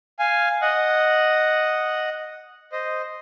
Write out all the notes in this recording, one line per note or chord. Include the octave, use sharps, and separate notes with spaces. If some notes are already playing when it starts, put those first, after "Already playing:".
F5 G#5
D#5 F#5
C5 D#5